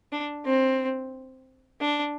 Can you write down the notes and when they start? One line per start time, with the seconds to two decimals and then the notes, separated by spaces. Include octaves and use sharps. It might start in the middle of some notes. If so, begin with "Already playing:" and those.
0.12 D4
0.46 C4
1.81 D4